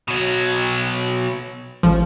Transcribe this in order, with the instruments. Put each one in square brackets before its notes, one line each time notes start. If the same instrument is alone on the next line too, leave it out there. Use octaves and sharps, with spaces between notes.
[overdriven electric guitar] B2 F#3
[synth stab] A1 F3